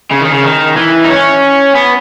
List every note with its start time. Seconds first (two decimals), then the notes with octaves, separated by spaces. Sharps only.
0.11 C#3
0.21 D#3
0.31 C#3
0.44 D#3
0.76 E3
1.04 D#4
1.09 C#4
1.75 B3